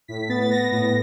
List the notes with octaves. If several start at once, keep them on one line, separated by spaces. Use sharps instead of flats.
A2 B6
B3 A6
A6
B3 A#6
A2 A#6